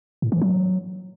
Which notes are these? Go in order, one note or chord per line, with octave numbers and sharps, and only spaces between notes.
A2
E3
F#3